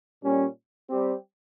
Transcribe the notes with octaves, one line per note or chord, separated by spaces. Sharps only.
A#2 G3 C#4
G3 C4 G4